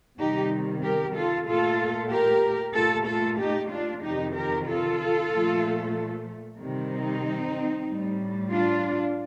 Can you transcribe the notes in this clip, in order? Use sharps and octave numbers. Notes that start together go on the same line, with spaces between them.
C3 D#3 G3 D#4 G4
G4 A#4
F4 A4
A#2 A3 F4 A4
G4 A#4
A#2 A3 F4 A4
F4 A4
D#4 G4
D4 F4
F2 C3 D#3 D#4 G4
G4 A#4
F4 A4
A#2 F3 A3
C3 D#3 G3
C4 D#4
A2 G3
D4 F4